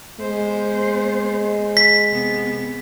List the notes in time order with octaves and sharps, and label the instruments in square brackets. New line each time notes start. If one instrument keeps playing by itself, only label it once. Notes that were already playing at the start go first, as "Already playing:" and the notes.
[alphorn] G#3 [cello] B3 C5
[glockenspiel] B6
[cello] C3 B3